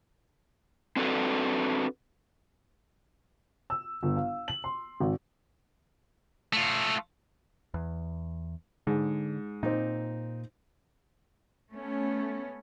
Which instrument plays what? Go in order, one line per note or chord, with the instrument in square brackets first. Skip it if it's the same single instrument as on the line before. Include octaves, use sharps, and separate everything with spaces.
[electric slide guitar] C4 D4 F#4 A4 B4
[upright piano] E6
G1
F5
F#7
C6
G#1
[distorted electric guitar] A3 F4
[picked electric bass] E2
[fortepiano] G#2 [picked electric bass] D3
[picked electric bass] A#2 [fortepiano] C4 D#4
[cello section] A3 B3 C#4